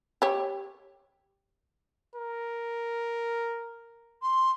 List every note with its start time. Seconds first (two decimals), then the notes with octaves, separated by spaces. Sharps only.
0.22 G4 C#5
2.16 A#4
4.22 C6